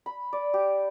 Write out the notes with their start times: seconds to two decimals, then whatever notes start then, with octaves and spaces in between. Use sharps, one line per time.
0.06 B5
0.33 D5
0.54 G4